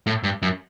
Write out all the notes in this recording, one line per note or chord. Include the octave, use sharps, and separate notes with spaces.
A2
G2
F#2